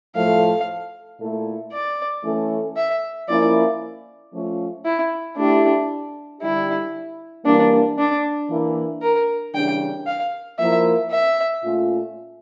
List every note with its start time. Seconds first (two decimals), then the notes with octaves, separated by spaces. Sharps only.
0.15 A2 F3 A3 E4 A4 F5
1.19 A#2 A3 E4 A4
1.72 D5
2.24 E3 A3 C#4 E4 A4
2.76 E5
3.28 F3 A#3 C#4 E4 D5
4.32 F3 A3 C#4 F4
4.85 E4
5.37 A3 D4 E4 G4
6.41 D3 G3 D4 E4 G4
7.45 E3 G3 A#3 D4
7.98 D4
8.50 E3 A#3 E4
9.02 A#4
9.54 C#3 E3 G3 D4 G5
10.06 F5
10.58 F3 A#3 E4 A#4 E5
11.11 E5
11.63 A#2 A3 C#4 F4